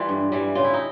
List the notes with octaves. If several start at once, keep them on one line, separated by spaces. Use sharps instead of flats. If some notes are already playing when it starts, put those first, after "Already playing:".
Already playing: E3 G3 F4 A4
G2
E3 G3
C#3 F4
E4
D#4